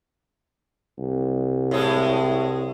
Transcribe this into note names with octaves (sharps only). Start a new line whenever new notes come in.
C2
A2 G#3 G#4